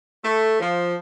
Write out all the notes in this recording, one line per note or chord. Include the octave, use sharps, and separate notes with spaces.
A3
F3